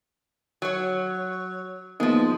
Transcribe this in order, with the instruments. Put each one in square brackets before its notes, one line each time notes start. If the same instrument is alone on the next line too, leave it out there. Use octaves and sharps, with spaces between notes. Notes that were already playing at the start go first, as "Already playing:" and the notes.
[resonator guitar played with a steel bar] F#3 C#5
[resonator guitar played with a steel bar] F3 G#3 [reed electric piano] A#3 B3 D#4